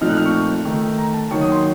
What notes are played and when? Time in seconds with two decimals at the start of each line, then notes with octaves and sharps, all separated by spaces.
0.01 A#2 F3 A3 C4 D#4 F6
0.09 F#6
0.17 F6
0.26 C#6
0.65 D#3 A3 D#4
0.99 A#5
1.14 A5
1.31 D#3 F#3 A#3 D#4 C#6
1.41 D#6
1.52 C6